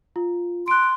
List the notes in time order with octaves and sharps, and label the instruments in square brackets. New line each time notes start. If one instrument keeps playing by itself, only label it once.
[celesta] F4
[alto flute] C6 [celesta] F#6 D7